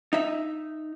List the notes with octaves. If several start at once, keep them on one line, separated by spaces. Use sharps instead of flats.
D#4 E5